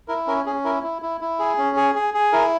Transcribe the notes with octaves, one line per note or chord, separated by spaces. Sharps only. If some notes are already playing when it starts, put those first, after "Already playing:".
E4 A#4
C#4 A#4
C#4 G#4
E4 A#4
E4
E4
E4
G#4
C#4
G#4
G#4
G#4
E4 A#4